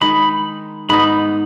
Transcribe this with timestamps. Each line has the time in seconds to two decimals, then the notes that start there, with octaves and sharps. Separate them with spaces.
0.01 D#3 G#3 D#4 B5
0.89 G#2 G#3 B3 D#4 B5